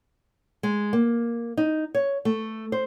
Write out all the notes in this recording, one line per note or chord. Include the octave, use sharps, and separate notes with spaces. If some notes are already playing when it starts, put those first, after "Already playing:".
G#3
A#3
D#4
C#5
A3
C5